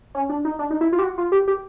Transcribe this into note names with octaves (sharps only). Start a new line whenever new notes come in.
C#4
D4
D#4
D4
D#4
E4
F4
G4
F#4
F4
G4
G4